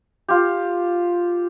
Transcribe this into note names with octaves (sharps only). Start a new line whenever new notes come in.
F4 G4